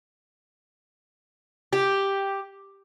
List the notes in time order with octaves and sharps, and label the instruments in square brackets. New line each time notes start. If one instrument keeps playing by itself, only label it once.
[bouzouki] G4